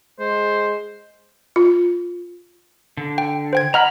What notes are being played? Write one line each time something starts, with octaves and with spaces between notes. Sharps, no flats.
G#3 C5
F4
D3
G5
C5 G5 G#6
D#5 F#5 A#5 B5 F6